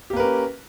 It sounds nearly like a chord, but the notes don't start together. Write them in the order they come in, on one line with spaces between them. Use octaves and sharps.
G4 A#3 B4 A#4 C#4